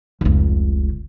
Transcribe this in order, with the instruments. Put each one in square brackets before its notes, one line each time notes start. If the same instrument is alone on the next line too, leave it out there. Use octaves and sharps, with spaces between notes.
[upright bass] F1 C#2